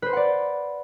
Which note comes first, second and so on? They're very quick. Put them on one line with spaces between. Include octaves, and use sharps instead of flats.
B4 C5 C6 F#5 D5